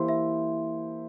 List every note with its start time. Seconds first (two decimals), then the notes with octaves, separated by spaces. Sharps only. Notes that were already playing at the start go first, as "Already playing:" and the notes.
Already playing: E3 A#3 E4 G4 C5 C6
0.08 E5